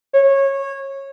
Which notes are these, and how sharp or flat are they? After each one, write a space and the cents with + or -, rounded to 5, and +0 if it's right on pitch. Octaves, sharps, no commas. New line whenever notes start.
C#5 -20